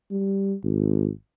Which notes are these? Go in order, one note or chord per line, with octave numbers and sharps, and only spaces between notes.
G3
G#1